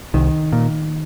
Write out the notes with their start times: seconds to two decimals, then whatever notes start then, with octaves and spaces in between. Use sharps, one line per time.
0.14 C2 D#3
0.52 A#2